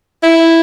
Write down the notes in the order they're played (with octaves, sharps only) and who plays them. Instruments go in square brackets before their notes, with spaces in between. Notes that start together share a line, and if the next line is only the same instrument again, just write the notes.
[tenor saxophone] E4